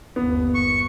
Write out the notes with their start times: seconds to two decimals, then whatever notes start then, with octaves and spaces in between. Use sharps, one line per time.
0.16 G1 D#2 B3
0.55 C#6